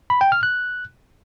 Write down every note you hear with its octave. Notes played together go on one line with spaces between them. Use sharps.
B5
G5
F6
F#6